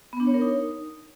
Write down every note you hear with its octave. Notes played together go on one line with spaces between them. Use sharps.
B3
D4
C#5
A#4
D#4